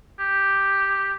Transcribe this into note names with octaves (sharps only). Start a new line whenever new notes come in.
G4